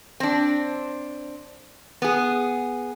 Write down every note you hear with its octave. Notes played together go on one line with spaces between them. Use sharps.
C4 D4
B3 G#4